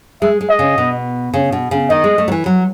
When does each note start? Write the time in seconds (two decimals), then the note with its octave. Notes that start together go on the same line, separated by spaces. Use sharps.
0.22 G#3 E5
0.41 G#3
0.50 D#5
0.59 C#3
0.78 B2
1.34 C#3
1.52 B2
1.71 C#3
1.90 D#3 D#5
2.04 G#3
2.18 A3
2.28 F#3
2.32 E3
2.46 F#3